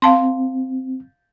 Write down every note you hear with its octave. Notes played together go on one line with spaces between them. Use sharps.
C4 F5 A5 C6